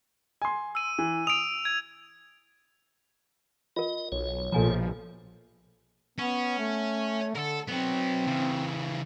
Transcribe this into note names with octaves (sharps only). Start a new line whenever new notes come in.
G#5 C6
E6 D#7
E3
D#6 D7 F7
G#6
F4 A#4 D#5
B1 C#5
A#1 B2 F3 A4 G#5 A#5
B3 C#4
A3
D3 A4 A#4
F#3 B3 C4
C#3 E3